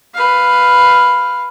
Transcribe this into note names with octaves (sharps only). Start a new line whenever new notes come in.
B4 F5